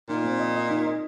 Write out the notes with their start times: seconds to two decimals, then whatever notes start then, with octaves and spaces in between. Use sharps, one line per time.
0.09 A#2 D#4
0.25 C4
0.40 D#5
0.56 D#5
0.70 D#4
0.87 D#5